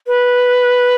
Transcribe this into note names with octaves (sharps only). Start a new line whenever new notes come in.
B4